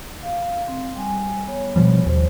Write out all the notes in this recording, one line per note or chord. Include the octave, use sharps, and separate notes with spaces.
F5
C4
G3 G#5
B3 C#5
B2 F3 G3
D#2 C5